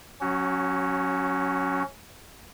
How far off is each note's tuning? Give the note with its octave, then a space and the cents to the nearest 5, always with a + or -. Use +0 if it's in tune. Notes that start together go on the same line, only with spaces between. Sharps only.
F#3 -20 C#4 +0 F#4 +25